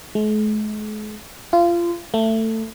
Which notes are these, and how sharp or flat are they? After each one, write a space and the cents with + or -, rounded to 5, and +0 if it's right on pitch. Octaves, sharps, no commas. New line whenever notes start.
G#3 +45
F4 -25
A3 +20